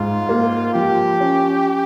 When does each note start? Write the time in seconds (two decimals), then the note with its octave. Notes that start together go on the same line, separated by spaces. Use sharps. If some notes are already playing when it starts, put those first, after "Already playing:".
Already playing: G#2 F4
0.29 A#3
0.74 F3 G4
1.20 C#4